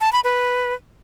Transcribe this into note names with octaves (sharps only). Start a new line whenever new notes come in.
A5
B5
B4